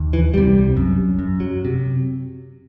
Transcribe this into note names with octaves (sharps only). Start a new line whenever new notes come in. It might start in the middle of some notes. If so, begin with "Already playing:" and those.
Already playing: D#2
E3
C2 C3 G3
F#2
F#2
F#3
C3